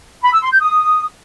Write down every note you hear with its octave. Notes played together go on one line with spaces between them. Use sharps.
B5
E6
C6
G6
D#6